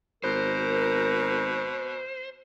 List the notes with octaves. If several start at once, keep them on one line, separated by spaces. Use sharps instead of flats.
G#1 B2 A#4 C5